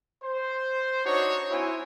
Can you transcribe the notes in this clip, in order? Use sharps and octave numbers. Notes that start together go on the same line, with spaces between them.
C5
D4 D#4 F#4 C#5
C4 E4 F#4 C5 C#5 G#5